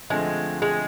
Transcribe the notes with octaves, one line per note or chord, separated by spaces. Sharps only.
D3 F3 G#3 A3 C4
G#3